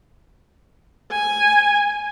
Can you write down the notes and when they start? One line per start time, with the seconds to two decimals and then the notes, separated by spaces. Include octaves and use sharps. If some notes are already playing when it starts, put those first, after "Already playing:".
1.12 G#5